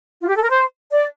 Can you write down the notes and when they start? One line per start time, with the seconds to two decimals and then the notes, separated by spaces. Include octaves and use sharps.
0.21 F4
0.28 G4
0.36 A4
0.42 A#4
0.50 C5
0.92 D5